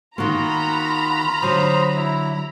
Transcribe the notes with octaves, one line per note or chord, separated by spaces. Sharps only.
D#3 A#3 F4 F#4 A#5 B5
D3 F#3 C5 D#6
E4